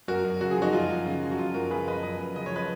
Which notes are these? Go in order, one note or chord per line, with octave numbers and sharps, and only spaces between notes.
F#2 F#4 A#4
F#2
C#3 F#4
G#4
F3 D#4 F#4
F#2 F4
F#2
C#3
F3
F#4
F#2 F4
F#2 F#4 A#4
C#3 G#4 B4
F3 B4 D#5
F#2 B4 D#5
F#2
C#3 D#5
C#5
F3 B4 D#5